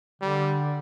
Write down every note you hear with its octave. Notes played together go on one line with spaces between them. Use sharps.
D3 G3